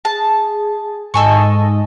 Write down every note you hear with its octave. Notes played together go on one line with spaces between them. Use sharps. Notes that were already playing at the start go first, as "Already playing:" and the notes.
G#4 A5
G#2 A4 D#5 G#5 C#6